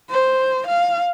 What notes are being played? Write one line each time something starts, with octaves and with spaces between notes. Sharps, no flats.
C5
F5